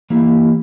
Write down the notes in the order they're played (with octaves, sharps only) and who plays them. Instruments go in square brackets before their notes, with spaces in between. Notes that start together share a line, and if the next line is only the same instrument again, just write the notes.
[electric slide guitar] E3 A#3 E4 G4